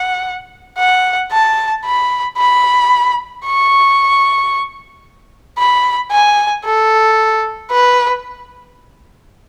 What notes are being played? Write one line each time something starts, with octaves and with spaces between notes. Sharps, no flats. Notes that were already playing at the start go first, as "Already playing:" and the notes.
Already playing: F#5
F#5
A5
B5
B5
C#6
B5
G#5
A4
B4